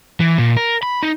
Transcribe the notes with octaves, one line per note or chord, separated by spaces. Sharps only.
E3
A#2
A#4
B5
D#4